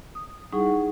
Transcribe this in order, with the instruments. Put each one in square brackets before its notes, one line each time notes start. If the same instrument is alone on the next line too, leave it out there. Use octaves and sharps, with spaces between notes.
[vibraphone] D#6
G3 D#4 E4 G#4 F#5 C#6